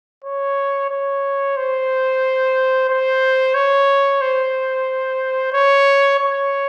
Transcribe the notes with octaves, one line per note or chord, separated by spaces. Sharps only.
C#5
C#5
C5
C5
C#5
C5
C#5
C#5